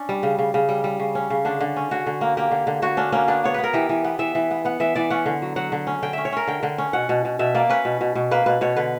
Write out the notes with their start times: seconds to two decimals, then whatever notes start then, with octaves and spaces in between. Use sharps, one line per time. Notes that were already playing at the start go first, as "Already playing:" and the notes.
Already playing: C#4 D4
0.09 G3
0.23 C#3
0.39 C#3
0.54 C#3
0.69 G3
0.84 G3
1.00 C#3
1.15 C#4
1.30 C#3
1.45 D3 D4
1.60 D3
1.76 C#4
1.91 D3 F#4
2.06 D3
2.21 A#3
2.37 A#3 G4
2.51 D3
2.67 D3
2.82 D3 F#4
2.97 C#4 D4
3.12 A#3 C#4
3.28 B3 D4
3.44 B3 C#5
3.54 B3 B4
3.64 A#4
3.73 E3 G4
3.89 E3
4.04 B3
4.19 E3 E5
4.35 E3
4.51 B3
4.65 B3 F#5
4.80 E3 E5
4.95 E3 D5
5.10 C#4 F#5
5.26 D3
5.42 F#3
5.56 F#3 F#5
5.72 D3
5.87 C#4
6.02 D3 G5
6.13 C#4 E5
6.25 C#5
6.32 C#4 A#4
6.47 D3 G5
6.63 D3
6.78 C#4
6.93 B2 F#5
7.09 B2
7.25 B2
7.39 B2 E5
7.54 A#3 D5
7.69 C#4 B4
7.85 B2
8.01 B2
8.15 B2
8.31 A#3 B4
8.46 B2 B4
8.61 B2 C#5
8.76 D3 B4